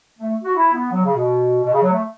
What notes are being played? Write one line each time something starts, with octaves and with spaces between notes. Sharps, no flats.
A3
F#4
E4
B3
F#3
C#3
B2
B2
C#3
F#3
A3